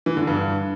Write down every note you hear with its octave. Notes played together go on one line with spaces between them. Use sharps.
E3
D3
G2